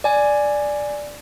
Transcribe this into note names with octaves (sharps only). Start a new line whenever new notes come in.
D5 G#5